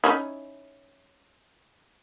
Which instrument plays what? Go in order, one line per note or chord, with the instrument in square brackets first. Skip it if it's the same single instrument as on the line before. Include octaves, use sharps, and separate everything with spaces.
[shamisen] C#4 D#4 E4